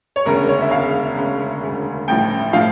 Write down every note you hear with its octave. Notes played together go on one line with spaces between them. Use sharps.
C#5
E1 D2 C#3 A#4
C#5
E5
E1 D2 C#3 F5
E1 D2 C#3
E1 D2 C#3
A1 A2 F3 G5
A2 F3 F5